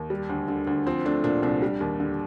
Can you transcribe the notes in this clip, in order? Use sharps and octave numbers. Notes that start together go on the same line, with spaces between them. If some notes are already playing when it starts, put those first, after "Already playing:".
Already playing: D#2
G3
D2
D3
D2
F3 C4
A3 D4
A#2 D4
C2 D4
G3
D#2
D3